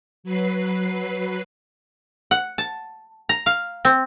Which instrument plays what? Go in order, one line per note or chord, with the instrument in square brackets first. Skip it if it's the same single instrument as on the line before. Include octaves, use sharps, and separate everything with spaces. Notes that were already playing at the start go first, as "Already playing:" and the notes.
[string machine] F#3 B4 C7
[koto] F#5
A5
A#5
F5
C4